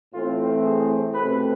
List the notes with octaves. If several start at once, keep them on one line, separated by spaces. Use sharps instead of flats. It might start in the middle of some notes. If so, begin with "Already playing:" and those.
A2 E3 A3 C4 F4
G#4
C2 B2 A3 C4 B4